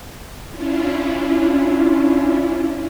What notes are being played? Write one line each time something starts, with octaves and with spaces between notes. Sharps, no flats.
C#4 D4 E4 F4